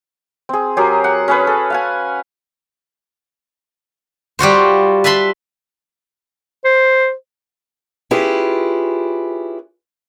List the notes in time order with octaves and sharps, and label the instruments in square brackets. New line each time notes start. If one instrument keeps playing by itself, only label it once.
[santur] C4 G#4
F#3 G4 G#4 A#4
F#5
C#4 G#4 B4
A4
F5 F#5 G#5
[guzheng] G3 F4 F#4 C5
B4 E5 A5 B5 C6
[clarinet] C5
[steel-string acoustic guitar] C#4 E4 F4 G4 G#4 B4